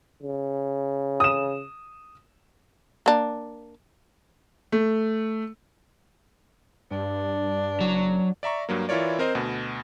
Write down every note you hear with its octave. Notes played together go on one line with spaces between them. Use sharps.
C#3
D#6 E7
A#3 D4
A3
G2 D4
F#1 F#3
D5 E5 A#5 C#6
G2 F#3 A#3
E3 E4 F4 A#4 C#5 D5
C4 A#4 C5 D#5
D2 B2